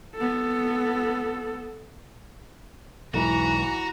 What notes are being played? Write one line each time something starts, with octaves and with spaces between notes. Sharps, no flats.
B3 A4
B1 E2 G#2 E3 F#4 A#5